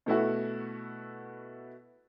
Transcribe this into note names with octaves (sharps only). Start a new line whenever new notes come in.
B2 A3 E4 F#4